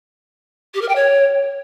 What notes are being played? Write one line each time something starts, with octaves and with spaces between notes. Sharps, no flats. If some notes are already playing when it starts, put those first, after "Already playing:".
G4
A#4
G5
C#5